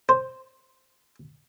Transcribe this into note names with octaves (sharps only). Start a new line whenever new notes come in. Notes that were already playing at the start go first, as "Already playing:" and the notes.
C5